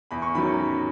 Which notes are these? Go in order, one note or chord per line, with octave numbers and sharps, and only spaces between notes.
E2 B5
C#6
D#3 F#3 C#4 B5